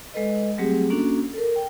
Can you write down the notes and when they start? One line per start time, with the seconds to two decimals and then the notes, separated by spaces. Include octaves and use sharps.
0.14 G#3 A4 B4 D#5
0.58 F#3 G3 A3 C4 G4 G#4
0.90 A#3 C#4 D4 F#4 A4
1.33 A4 A#4
1.56 G5